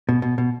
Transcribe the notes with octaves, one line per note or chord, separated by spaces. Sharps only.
B2
B2
B2